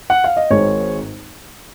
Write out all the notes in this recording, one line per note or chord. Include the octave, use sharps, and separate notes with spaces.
F#5
F5
D#5
G#1 G#2 D#3 G#3 C#5